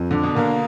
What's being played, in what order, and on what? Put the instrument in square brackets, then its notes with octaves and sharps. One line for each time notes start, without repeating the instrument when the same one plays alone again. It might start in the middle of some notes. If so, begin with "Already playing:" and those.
Already playing: [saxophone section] F2
[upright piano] D3 [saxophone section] D4
[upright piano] B2
[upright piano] D3 [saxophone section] A#3